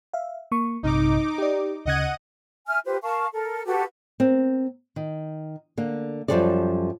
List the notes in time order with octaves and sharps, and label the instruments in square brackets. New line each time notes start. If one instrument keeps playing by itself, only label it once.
[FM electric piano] E5 F5
A#3 C#6
[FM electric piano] A#1 G2 C3 [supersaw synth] D#4 D6
[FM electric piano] G4 D5
[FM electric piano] D2 C#3 G#6 [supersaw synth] D#5 F#5 D#7
[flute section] E5 G#5 F6
F4 G4 B4 C5
A#4 F5 A5 C#6
A4 A#4
F#4 G4 A4 B4
[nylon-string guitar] C4 A#4
D#3
D3 A#3
F#2 A#2 F3 G3 A4 D5